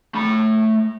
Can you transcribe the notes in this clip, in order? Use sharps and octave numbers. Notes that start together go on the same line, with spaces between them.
A3 B5